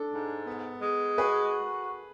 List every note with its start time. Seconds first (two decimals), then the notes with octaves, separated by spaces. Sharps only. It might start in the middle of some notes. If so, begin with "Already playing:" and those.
Already playing: D4 A4
0.12 G#2
0.47 B3
0.82 G#3
1.18 F#4 G#4 B4